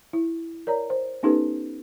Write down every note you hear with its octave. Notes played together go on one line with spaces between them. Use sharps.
E4
A#4 C#5 D5 A#5
C5
B3 C#4 D#4 G4 A4 B4